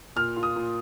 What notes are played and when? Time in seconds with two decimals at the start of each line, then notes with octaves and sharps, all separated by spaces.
0.16 A#2 F6
0.36 F4
0.43 D#6
0.56 A#2